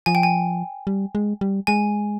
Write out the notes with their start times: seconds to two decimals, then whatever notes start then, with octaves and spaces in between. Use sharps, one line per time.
0.06 F3 G#5
0.15 G5
0.23 G#5
0.87 G3
1.15 G#3
1.41 G3
1.67 G#3 G#5